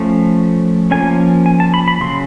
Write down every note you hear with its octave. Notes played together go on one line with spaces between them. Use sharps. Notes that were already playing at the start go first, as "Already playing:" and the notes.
Already playing: F3 A3 C#4
F3 A#3 C#4 G#5
G#5
A5
B5
B5
C#3 F#3 C6